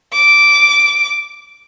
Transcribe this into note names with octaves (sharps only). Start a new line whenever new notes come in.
D6